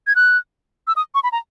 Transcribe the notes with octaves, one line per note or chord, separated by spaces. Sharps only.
G#6
F#6
E6
D#6
C#6
B5
A#5